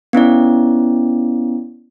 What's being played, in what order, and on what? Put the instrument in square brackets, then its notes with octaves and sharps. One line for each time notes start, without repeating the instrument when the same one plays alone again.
[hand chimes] B3 C#4 E4 D5